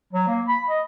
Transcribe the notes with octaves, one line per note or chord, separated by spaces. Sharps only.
F#3
A#3
B5
D#5